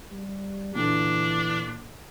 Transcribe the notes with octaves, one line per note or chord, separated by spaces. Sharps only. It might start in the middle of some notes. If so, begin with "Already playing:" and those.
G3
A#2 D3 E3 D4